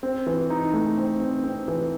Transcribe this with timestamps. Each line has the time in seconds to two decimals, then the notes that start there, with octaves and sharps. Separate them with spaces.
0.03 C4
0.27 E3
0.50 D#4
0.73 A3
0.98 C4
1.20 C4
1.44 C4
1.68 E3